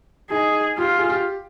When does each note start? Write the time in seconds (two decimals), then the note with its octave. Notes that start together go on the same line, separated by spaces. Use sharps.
0.30 D#4 G#4
0.78 F4 G4
0.99 G#4
1.10 G4